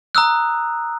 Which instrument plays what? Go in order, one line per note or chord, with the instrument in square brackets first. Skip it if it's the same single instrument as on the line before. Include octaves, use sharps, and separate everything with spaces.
[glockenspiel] A#5 D#6 E6 F#6